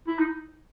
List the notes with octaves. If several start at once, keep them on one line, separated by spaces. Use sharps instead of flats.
E4
D#4